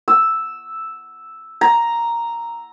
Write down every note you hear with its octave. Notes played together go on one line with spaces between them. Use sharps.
E6
A#5